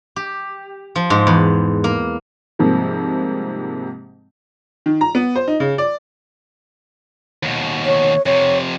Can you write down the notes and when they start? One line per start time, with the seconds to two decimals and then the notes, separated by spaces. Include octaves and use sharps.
0.16 G4
0.96 F3
1.10 G#2
1.27 E2
1.84 A#3
2.59 G#2 C3 F3 G3 A#3
4.86 D#3
5.01 A#5
5.15 B3
5.36 C5
5.48 D#4
5.60 C#3
5.78 D5
7.43 D#2 B2
7.86 C#5
8.26 F2 C3 C#5